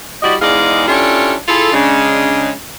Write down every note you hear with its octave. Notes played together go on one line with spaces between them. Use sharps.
G3 E4 F#4 G4 D5 D#5
E2 G#2 G#4 D5 D#5 F5
C#4 D4 E4 F4 G4 A4
E4 F4 G#4 A4
C#3 G#3 D4